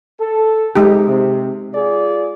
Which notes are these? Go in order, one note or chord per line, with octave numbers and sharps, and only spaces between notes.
A4
C3 G#3 D#4 G4
C3
F4 G#4 D5